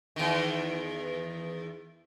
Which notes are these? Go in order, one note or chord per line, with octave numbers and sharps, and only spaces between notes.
E2 D#3